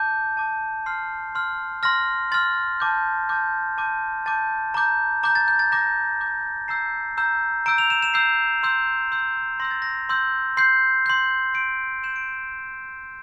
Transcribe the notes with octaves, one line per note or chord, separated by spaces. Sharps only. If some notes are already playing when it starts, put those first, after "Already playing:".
Already playing: A5 D6 G6
A5 D6 G6
C6 F6 C7
C6 F6
C6 F6 A#6
C6 F6 A6
A5 D6 G6
A5 D6 G6
A5 D6 G6
A5 D6 G6 A6
A#5 D6 G6
A#5 D6 G6
A6
G6
A6
A#5 D6 G6 A#6
A#5 D6 G6
A#5 E6 G6 C7
A#5 E6 G6
A#5 E6 G6 D7
F7
E7
E7
A#5 E6 G6 C7
C6 E6 G6
C6 E6 G6
C6 E6 G6 A#6
A6
A#6
C6 E6 G6
C6 G6 C7
C6 G6
C6 G6 D7
C6 G6 E7
D7